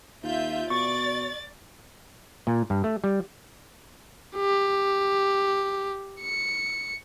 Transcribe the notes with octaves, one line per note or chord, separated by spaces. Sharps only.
D#2 F4 E5 G6
B2 D5 C#6 A6
A#2
G2
A3
G3
G4
C#7